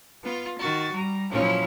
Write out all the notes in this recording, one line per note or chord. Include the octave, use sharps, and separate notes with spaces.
B3 F4
D#3 F#4 A6
G3 A#5
A#2 F3 F#3 C#4 E4